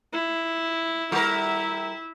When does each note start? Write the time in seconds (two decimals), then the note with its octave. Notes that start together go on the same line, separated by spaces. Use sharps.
0.13 E4
1.12 G3 E4 A#4 E5